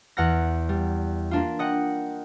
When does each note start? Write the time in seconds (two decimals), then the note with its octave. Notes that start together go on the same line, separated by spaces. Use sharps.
0.17 E2 F#5 F6 A#6
0.69 G3
1.31 A#3 D4 F4
1.59 D#5 F#5 G5